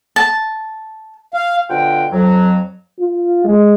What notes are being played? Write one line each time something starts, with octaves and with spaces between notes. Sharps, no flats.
A5
F5
B2 D3 F4 F#5 G5
F2 F#3
F4
G#3